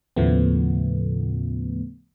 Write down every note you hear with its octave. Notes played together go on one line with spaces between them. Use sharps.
D#2 A2 C#3 F3 A3 B3